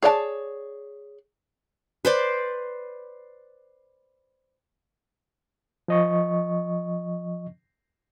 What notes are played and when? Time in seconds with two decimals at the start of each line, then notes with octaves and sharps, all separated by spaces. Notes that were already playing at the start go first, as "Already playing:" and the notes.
0.03 G#4 C#5 D5 F#5 A5
2.05 B4 C5 D5
5.88 F3 D#5 C#6